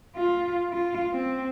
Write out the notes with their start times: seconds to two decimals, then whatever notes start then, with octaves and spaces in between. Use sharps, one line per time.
0.16 F4
0.72 F4
1.14 C4